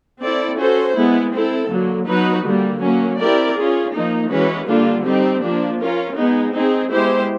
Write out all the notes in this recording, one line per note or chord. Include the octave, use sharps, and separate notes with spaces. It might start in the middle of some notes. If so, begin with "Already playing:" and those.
C4 E4 A4 D5
C#4 F#4 A4 C5
G#3 B3 E4
C4 E4 A4
D3 F#3 A#3
F#3 B3 D#4 F#4 B4
D3 G3 A#3
F#3 A#3 C#4
C4 E4 G4 A#4 D5
C#4 F4 G#4
F3 A#3 D#4
E3 G#3 C#4 F#4 B4
D3 G3 A#3 D4 F4
G3 C4 D#4 G4
F3 A#3 D4
C#4 F4 A#4
G#3 B3 D#4 G#4
C4 D#4 G#4
G#3 B3 E4 G4 C5